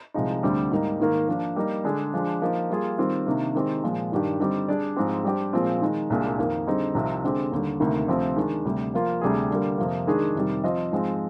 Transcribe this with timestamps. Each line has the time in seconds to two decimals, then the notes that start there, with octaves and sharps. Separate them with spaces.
0.14 C2 C3 F3 G#3 D#4
0.43 D2 D3 G3 C4
0.71 G#2 G3 A#3 D#4
1.00 G#2 D#3 A#3
1.28 F3 A#3 D4
1.56 G3 A#3 D#4
1.84 D3 G#3 D4 G#4 D5
2.13 F3 G#3 D4
2.42 F3 A#3 D#4
2.70 G3 A#3 F4 G#4
2.98 D#3 G3 C4 F4
3.27 C3 D#3 A#3 D4
3.55 D#3 G#3 C4 D#4 G4
3.84 A#2 F3 G#3
4.12 G2 D#3 G3 D4 G4
4.40 D3 G3 C4 D#4 G4
4.68 G3 D4 G#4 D5
4.96 G#2 F3 G#3 C4 G4
5.24 G3 D4 G4 C5
5.53 A#2 F3 G#3 C4 F4
5.81 D#3 G#3 D#4
6.10 C2 A#2 G#3 D4
6.38 F2 D#3 A#3
6.67 D3 G3 C4 D#4 G#4
6.95 C2 C3 F3 C4 D#4
7.24 D3 G#3 C4 G4
7.52 D#2 D3 G3
7.80 D2 C3 D#3 A#3
8.08 D2 C3 F3 C4
8.36 D#3 G#3 D4
8.65 D2 C3 G3
8.94 F3 A#3 F4
9.21 D2 C3 G3 D4 G#4
9.51 D3 G3 A#3
9.78 F2 C3 F3 A#3
10.07 D#3 G#3 D4 G#4
10.35 F2 C3 D#3 G3
10.64 F3 C4 F4 C5 D#5
10.92 G#2 F3 G#3 C4